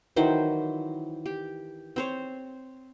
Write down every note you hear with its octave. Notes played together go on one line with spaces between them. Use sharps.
D#3 E3 F#3 C5
G4
C4 C5 C#5